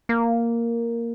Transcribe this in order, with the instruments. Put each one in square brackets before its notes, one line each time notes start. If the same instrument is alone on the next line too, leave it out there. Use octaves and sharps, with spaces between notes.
[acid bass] A#3